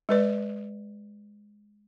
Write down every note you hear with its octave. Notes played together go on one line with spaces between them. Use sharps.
G#3 B4 D5